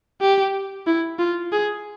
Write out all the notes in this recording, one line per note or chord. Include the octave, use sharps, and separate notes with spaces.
G4
E4
F4
G#4